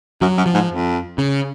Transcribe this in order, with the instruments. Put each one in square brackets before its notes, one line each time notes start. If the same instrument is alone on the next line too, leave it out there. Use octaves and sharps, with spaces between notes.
[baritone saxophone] F#2 [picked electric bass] F#3
[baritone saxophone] F#2
[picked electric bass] F3
[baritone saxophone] G#2
F2
[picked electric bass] C#3